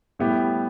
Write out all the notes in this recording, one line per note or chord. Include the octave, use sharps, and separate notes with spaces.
A2 G3 B3 E4 G4